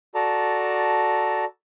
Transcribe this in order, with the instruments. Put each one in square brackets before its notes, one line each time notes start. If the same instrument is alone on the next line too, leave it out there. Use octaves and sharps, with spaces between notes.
[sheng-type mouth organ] F#4 A4 D5 A5 A#5